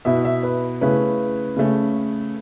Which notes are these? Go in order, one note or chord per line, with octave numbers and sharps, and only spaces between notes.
B2 B3 E4 E5
E5
B4
C#3 A3 C#4 E4 B4
C#3 A3 C#4